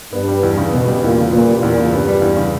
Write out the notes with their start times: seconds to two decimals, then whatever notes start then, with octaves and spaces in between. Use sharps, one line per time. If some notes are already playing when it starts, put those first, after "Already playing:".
0.13 G2 B3
0.28 G3
0.43 E2
0.58 C#3
0.73 B2 B3
0.88 G3
1.02 E2 A#2
1.18 C#3
1.33 A#2 B3
1.48 G3
1.63 E2 A#2
1.78 C#3
1.92 G2 B3
2.08 G3
2.22 E2
2.37 C#3